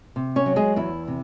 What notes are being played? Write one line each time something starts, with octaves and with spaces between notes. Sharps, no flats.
C3
C#4 C#5
F#3
G#3 G#4
E2 E4
C3